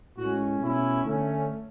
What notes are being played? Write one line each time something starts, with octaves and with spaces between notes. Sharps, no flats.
A2 G#3 C#4 F#4
B2 A3 C#4 E4
D3 A3 C#4